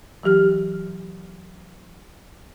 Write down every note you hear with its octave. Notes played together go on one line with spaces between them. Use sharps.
E3 F#3 G4 F6